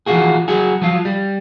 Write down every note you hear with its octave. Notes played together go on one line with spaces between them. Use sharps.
E3 F3 F4 F#4 G#4
F#3 F#4 G#4
F3 F#3 F4
G3